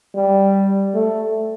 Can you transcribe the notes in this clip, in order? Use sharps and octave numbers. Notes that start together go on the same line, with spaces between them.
G3
A3